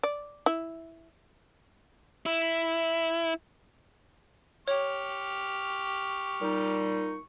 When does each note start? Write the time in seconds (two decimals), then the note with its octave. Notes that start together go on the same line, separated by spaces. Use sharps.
0.03 D5
0.46 E4
2.26 E4
4.68 G4 C#5 C#6 F6
6.42 A#2 G3 D#4